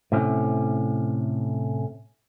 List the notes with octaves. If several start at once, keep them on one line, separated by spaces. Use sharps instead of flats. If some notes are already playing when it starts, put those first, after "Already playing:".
A2 C3 C#4